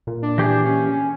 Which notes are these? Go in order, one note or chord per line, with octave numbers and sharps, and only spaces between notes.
A#2
D4
E3 G4 G#4
C#4